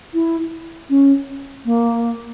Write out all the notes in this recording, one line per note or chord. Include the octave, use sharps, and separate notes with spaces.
E4
C#4
A#3